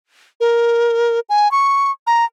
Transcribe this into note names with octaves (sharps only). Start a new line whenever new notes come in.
A#4
G#5
C#6
A#5